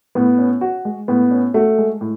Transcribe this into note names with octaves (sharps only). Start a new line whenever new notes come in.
A2 B3
C#4
F#4
G#3
A2 B3
C#4
A3 F#4
G#3
A2